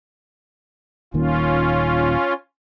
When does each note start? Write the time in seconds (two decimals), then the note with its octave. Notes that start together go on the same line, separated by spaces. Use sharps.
1.14 D#1 A#2 D#3 C#4 F4